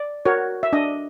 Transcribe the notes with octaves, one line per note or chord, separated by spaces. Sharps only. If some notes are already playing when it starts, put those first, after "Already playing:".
Already playing: D5
F#4 A#4 C#5
E5
D4 D#5